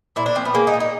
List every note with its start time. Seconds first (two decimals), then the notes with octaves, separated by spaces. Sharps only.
0.16 A#2 E4
0.26 D4
0.35 F3 C4
0.45 B3
0.54 G#3 A#3
0.67 D#4
0.74 A#2
0.80 D#4